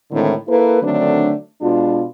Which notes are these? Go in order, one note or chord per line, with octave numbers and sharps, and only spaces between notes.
A2 D3 D#3 G#3 C4 E4
A#3 E4 A4 B4
D3 D#3 F#3 A3 C4 D4
B2 G#3 D4 F4